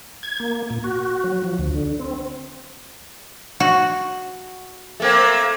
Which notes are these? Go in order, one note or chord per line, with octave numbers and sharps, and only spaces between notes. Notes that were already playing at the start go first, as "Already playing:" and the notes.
G#6
A#3
A#2
F#4
F#3
F3
D2
D3
C4
F#4
A3 A#3 C4